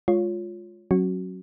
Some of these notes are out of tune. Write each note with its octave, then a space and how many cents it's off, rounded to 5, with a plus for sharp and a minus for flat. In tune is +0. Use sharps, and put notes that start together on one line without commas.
G#3 +0 F4 +10 C#5 +0
F#3 +0 C#4 -30 F#4 +0